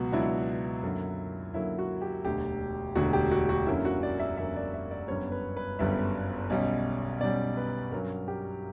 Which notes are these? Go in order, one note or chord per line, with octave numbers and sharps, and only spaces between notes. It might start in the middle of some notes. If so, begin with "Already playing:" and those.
Already playing: C#2 B2 F#3 B3 F#4
C#2 B2 F#3 B3 D4 E4
F#2 D3 F#3 A#3
F#2 D3 F#3 A#3 E4
F#4
G4
E1 D2 D3 G4
E1 D2 D3 F#4
G4
F#4
F#4
F#2 D3 A#3 C#4 E4
F#4
D5
E5
F#2 D3 A#3 C#4 E5
D5
E5
D5
G1 F#2 D3 G3 B3 C#5
B4
B4
G1 F#2 D3 G3 B3 E5
B1 B2 G3 C#4
B1 B2 G3 C#4 D5
B4
G2 F#3 C#4 A#4
G4